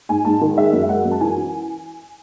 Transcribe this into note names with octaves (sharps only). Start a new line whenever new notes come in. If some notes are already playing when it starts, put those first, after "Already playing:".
G#2 G#5
G#2 A5
D#3
G#3 E5
F#2
E5
G#3 F#5
F#2
A5
E3 G#5
E3